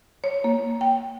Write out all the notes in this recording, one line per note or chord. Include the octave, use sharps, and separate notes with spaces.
C#5
A#3
G5